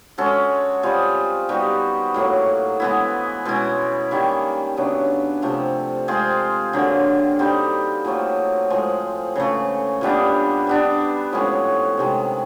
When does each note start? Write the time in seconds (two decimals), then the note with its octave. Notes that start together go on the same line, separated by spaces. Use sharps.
0.18 G#3 C#4 F#4 A4
0.83 G3 C4 F4 G#4
1.49 G3 B3 D#4 F#4
2.14 A2 F#3 A#3
2.80 E3 G#3 B3 E4
3.45 B2 G#3 C#4 E4
4.11 D#3 G3 A#3
4.77 C#3 F#3 B3 D4
5.42 C3 F3 A3
6.08 G#3 C4 F4 G#4
6.73 D3 F#3 A#3
7.39 G3 C4 D#4
8.05 A#2 F#3 A3 C4
8.70 A2 F3 G#3
9.36 C#3 E3 A3
10.01 A#2 G3 B3 D4
10.67 G3 B3 D4
11.32 A2 F3 G#3 C#4
11.97 C3 D#3 G#3